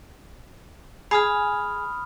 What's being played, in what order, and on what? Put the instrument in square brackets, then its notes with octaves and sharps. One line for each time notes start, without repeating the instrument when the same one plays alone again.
[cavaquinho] G#4 G#5 [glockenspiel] B5 D#6 F6